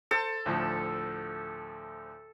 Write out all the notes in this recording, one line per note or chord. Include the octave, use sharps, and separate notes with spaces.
A4 C5
D2 A2 F3